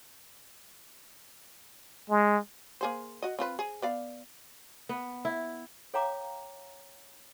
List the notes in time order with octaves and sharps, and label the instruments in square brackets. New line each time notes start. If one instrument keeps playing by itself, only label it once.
[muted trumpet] G#3
[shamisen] A#3 G#4 C5
F#4 D#5
C4 F4 B4
G#4
B3 D5 F5
[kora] B3
E4
[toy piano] A4 C#5 F5 G5 A#5 D6